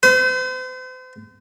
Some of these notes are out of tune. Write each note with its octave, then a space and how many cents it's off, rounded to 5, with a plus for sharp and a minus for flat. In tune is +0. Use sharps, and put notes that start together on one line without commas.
C5 -40